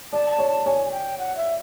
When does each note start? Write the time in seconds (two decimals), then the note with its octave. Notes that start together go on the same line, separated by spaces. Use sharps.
0.13 D5 A5
0.30 A5
0.39 C#5
0.48 A5
0.66 C#5 G#5
0.85 G#5
0.92 G5
1.18 F#5
1.36 E5